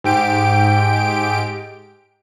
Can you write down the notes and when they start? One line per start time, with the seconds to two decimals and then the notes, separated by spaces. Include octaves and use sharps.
0.04 G#2 G4 D7